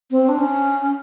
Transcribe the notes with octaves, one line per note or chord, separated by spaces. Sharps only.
C4
D4
C#4